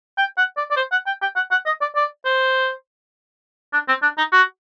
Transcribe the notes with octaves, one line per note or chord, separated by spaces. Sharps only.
G5
F#5
D5
D5
C5
F#5
G5
G5
F#5
F#5
D#5
D5
D5
C5
D4
C4
D4
D#4
F#4